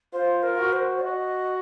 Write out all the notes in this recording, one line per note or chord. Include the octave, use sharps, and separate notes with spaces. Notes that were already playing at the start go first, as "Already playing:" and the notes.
F4 C5
A#4
F#4
C5
F#4 D#5